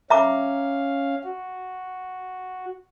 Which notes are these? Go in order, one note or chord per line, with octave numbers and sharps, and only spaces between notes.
C#4 E5 F5 A#5 D6
F#4